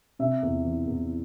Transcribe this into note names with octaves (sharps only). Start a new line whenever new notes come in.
C3 E5
E2
E3
E2